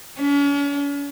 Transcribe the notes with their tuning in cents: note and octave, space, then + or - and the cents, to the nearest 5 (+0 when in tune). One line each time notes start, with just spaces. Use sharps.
C#4 +40